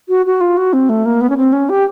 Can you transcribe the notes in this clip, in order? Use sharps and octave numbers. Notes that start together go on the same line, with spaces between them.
F#4
F#4
F4
F#4
C4
A3
A#3
B3
C#4
C4
C#4
G4